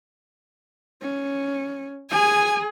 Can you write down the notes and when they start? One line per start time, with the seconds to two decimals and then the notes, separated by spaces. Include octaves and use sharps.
1.02 C#4
2.11 G#4 G#5